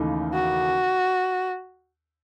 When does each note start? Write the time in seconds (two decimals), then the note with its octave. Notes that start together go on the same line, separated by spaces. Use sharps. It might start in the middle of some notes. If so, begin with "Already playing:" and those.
Already playing: D#2 C#3 E3 A3 D#4
0.34 F#4